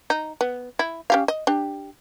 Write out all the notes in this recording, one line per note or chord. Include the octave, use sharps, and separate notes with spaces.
D#4
B3
E4
C#4 G4 F5
D#5
D4 G4